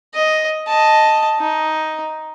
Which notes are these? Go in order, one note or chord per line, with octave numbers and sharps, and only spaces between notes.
D#5
D#5 A5
D#4